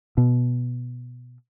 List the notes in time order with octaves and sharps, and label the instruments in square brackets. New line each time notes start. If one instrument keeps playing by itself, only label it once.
[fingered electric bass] B2